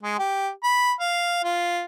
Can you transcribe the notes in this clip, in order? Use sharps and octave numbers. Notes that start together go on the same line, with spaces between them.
G#3
G4
B5
F5
F4